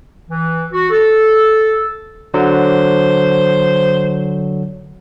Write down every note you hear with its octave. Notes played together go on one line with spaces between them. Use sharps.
E3
F#4
A4
D3 F#3 C5